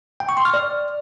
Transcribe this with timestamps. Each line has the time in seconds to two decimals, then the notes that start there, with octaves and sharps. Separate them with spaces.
0.20 G5
0.29 C#6
0.37 C6
0.45 F6
0.54 D5